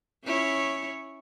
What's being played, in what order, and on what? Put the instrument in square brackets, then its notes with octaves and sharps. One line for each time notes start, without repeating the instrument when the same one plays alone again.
[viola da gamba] C#4 E4 C#5